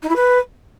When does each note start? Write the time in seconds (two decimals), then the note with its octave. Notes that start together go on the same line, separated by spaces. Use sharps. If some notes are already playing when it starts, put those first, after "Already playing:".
0.02 D#4
0.09 E4
0.15 B4